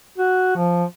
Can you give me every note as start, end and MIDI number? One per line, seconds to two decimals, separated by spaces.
0.18 0.51 66
0.56 0.85 53